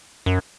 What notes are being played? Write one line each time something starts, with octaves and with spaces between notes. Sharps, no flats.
F#2